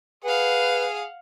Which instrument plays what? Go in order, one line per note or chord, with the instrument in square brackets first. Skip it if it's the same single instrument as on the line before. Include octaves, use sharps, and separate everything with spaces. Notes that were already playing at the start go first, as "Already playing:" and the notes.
[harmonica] G#4 [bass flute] B4 [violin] F5 F#5